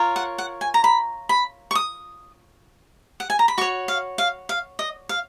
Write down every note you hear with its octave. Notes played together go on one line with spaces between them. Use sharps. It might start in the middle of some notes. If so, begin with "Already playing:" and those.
Already playing: F4 A#4 C#5
F#5
F#5
G#5
A#5
B5
B5
C#6
D#6
F#5
G#5
A#5
B5
F#4 C#5 C#6
F5
F5
F5
D#5
F5